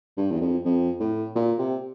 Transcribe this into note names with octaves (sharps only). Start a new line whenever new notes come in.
G2
E2
F2
F2
A2
A#2
C3